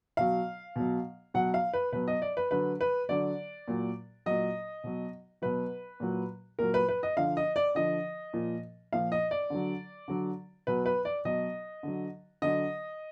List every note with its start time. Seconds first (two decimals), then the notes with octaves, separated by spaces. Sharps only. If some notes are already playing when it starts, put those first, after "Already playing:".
0.17 B2 F#3 F5
0.76 B2 F#3
1.34 B2 F#3 F#5
1.54 F5
1.73 B4
1.92 B2 F#3 B4
2.08 D#5
2.22 D5
2.37 B4
2.51 D3 F#3 B4
2.81 B4
3.09 D3 F#3 D5
3.68 A#2 F#3
4.26 A#2 F#3 D#5
4.84 B2 F#3
5.42 B2 F#3 B4
6.00 A#2 F#3
6.59 A#2 F#3 A#4
6.74 B4
6.89 B4
7.03 D#5
7.17 D3 F3 F5
7.37 D#5
7.56 D5
7.75 D3 F3 D#5
8.33 A#2 F3
8.92 A#2 F3 F5
9.12 D#5
9.31 D5
9.50 D3 F#3
10.08 D3 F#3
10.67 B2 F#3 B4
10.86 B4
11.05 D5
11.25 B2 F#3 D#5
11.83 D3 F#3
12.42 D3 F#3 D#5